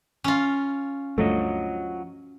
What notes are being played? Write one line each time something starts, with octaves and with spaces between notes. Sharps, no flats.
C#4 F4
D2 G2 F3 F#3 A3 D#5